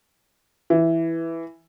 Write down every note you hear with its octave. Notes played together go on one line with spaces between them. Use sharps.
E3